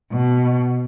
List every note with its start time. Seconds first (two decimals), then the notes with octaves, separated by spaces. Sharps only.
0.12 B2